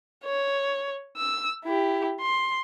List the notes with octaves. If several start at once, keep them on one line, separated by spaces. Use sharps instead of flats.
C#5
E6
E4 G4
C6